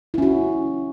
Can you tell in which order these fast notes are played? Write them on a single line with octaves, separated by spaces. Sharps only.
E4 C#4 F#4